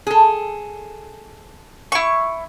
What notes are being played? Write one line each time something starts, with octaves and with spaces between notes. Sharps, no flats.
G#4 A4
E4 C#6